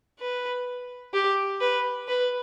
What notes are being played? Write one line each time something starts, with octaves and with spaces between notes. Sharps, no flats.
B4
G4
B4
B4